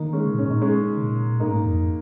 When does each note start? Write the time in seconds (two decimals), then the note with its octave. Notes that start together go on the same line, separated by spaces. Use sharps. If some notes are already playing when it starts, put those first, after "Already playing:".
Already playing: D#3 A#3 D#4
0.13 G#3 C#4
0.26 C#3
0.33 A#2
0.39 G#2 C#4
0.48 A#2 D#4
0.62 G#3 C#4
0.97 C#3
1.02 A#2
1.40 G#2 A#3 D#4
1.66 F2